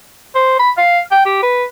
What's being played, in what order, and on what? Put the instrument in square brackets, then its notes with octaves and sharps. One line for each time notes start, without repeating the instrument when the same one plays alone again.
[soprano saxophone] C5
B5
F5
G5
G4
B4